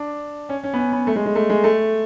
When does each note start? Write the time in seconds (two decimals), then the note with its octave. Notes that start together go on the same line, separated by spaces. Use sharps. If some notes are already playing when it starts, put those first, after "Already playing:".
Already playing: D4
0.49 C#4
0.64 C#4
0.73 B3
0.78 C#4
0.92 B3
1.07 A3
1.16 G#3
1.26 G#3
1.35 A3
1.50 G#3
1.64 A3